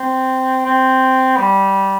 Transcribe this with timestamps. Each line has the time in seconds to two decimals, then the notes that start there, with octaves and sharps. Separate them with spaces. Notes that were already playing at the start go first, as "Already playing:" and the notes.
Already playing: C4
0.65 C4
1.37 G3